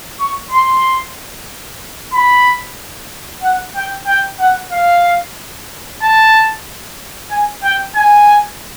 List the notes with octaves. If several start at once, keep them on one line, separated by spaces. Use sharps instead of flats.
C#6
C6
B5
F#5
G5
G5
F#5
F5
A5
G#5
G5
G#5